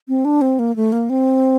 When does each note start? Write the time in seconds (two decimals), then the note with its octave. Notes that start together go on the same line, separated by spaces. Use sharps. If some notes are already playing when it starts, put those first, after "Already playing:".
0.08 C4
0.25 D4
0.41 C4
0.59 A#3
0.76 A3
0.92 A#3
1.10 C4